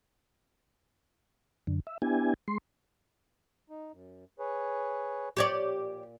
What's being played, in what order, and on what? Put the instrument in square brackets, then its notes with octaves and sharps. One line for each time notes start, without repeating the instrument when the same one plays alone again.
[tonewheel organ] F#2 D3
E5
B3 D4 E4 G4 G#5
G#3 C6
[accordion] D#4
F#2
G#4 B4 C#5
[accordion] A#2 [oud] G4 C#5 D5